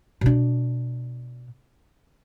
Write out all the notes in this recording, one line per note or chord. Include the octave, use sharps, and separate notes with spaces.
B2 D4